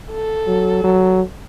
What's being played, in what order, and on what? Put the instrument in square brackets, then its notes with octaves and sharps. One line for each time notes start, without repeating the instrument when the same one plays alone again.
[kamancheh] A4
[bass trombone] F#3
F#3